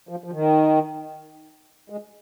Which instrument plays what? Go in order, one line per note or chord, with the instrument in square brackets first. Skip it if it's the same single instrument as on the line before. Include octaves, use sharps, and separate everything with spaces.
[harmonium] F3
F3
D#3
G#3